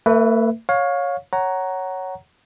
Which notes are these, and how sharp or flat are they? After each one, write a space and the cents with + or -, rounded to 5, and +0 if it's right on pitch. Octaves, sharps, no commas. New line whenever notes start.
A3 +45 B4 +0 E5 +0
C#5 +0 F5 +25
C#5 +0 F#5 +15 A#5 +0